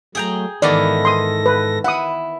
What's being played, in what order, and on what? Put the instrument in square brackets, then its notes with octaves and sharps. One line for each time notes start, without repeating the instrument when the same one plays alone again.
[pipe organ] F#3 A3 [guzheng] G#4 G5 A#5
[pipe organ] G#2 A4 A#6 [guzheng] D#3 E3 B3 [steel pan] D5
[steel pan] C6 D#6
B4
[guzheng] E4 [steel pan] F#5 D#6